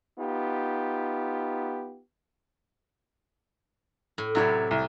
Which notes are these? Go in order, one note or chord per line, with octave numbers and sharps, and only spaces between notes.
B3 D#4 F4 G4
A2
A2 C3 F#3 E4 C#5 D5
C2